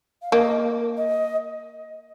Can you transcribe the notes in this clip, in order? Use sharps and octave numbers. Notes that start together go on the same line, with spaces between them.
F5
A#3 D#5
D#5